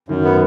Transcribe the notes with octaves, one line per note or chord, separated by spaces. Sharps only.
F#2 D#3
D#3 B3